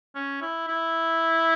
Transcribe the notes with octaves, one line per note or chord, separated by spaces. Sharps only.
C#4
E4
E4